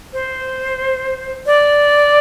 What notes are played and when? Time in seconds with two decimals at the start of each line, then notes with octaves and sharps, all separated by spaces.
0.13 C5
1.46 D5